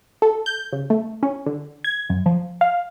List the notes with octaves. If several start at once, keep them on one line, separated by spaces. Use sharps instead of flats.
A4
G6
C#3
A3
C#4
D3
G#6
F#2
F3
F5